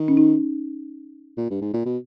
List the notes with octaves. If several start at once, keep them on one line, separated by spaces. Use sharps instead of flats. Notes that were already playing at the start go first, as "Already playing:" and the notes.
Already playing: D#3
C#4
D#4
A#2
G2
G#2
A#2
B2